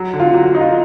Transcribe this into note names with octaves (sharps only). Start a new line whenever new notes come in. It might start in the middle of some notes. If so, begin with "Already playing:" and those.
Already playing: F#3
D3
F4
F#3 F#4
D#4
F4